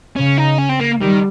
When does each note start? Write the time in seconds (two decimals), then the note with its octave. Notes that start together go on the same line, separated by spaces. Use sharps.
0.16 C#3 C#4
0.38 D#4
0.58 C#4
0.69 C4
0.80 A#3
1.00 D#3 G3